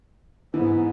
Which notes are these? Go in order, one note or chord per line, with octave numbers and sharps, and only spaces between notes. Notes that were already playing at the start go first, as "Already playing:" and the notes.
G#2 E3 B3